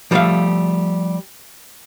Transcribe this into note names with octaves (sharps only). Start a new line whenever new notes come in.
F3 G3 A3 D5 E5 F5